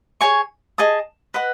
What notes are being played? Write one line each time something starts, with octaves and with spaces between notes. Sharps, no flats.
G#4 C#5 G#5 C#6
G#4 D#5 A5 D#6
B4 D#5 F#5 B5